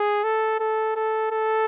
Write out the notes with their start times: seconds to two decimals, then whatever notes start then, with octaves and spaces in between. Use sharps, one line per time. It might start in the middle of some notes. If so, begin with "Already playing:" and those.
Already playing: G#4
0.24 A4
0.60 A4
0.96 A4
1.31 A4